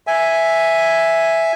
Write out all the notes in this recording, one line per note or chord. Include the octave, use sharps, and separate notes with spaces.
E5 G#5